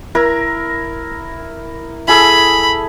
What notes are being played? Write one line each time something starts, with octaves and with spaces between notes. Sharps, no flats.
E4 A#4 A#5
E4 G#4 A4 B5